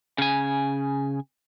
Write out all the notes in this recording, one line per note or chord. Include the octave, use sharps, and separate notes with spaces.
C#3 G#5